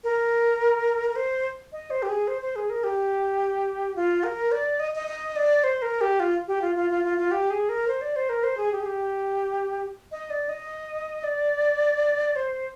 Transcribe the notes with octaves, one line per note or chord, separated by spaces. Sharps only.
A#4
A#4
C5
D#5
C5
G4
G#4
C5
C5
G#4
A#4
G4
F4
A#4
D5
D#5
D#5
D#5
D5
C5
A#4
G4
F4
G4
F4
F4
F4
F4
F4
G4
G#4
A#4
C5
D5
C5
A#4
C5
G#4
G4
G#4
G4
D#5
D5
D#5
D5
C5